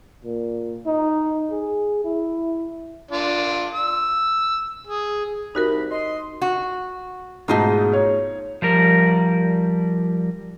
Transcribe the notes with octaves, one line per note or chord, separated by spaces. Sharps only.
A#2
D#4
G#4
E4
D4 F4
E6
G#4
C2 D#4 F#4 A#4 B5
D#5 C6
F#4
G#2 B2 G#3 A3 D#4 F4
C#5
F3 G3 A#4